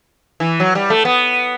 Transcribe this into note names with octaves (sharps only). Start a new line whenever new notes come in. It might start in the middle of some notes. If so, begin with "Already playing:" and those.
E3
F#3
G3
A3
B3